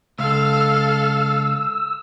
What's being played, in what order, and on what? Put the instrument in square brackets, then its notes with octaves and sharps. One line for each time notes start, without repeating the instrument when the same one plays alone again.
[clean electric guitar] C#2 [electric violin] A4 F5 [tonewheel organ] E6